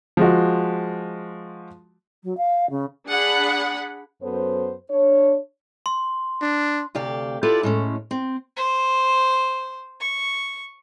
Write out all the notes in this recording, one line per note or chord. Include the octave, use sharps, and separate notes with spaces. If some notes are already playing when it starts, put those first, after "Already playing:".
F3 G#3 F#4
F#3
F5
C#3
D4 G#4 F#5 B5
F#2 B3 A4 C5
D4 C#5
C6
D4
D2 C3 G4 D5 F5
E4 F4 G4 A4 B4 D5
A2 G#3 C#4
C4
C5
C#6